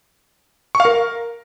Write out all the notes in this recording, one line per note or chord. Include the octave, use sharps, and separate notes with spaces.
C#6
F5
A#4